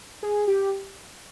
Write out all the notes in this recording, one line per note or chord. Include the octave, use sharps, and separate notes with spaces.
G#4
G4